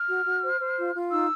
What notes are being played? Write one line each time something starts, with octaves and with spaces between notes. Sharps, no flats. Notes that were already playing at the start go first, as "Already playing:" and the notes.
Already playing: F6
F#4
F#4
C5
C5
F4
F4
D#4 E6